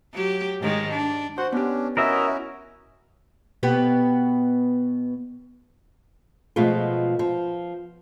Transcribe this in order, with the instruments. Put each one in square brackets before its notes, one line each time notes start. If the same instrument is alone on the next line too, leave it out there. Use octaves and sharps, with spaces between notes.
[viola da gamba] F#3 G4
G#2 D#3 G#3
D4
[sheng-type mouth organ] F#4 F#5 [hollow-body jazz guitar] C5
[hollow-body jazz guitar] B3 G4 [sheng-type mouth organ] C#4 D4
[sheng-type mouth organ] C#4 E4 F#4 [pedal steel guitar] A#4 D#5 E5
[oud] B2 B3 G4
[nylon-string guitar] B2 F3 G#3 A3 F4
F3